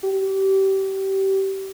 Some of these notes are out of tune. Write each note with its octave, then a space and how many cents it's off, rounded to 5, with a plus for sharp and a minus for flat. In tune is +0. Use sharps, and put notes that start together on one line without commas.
G4 -25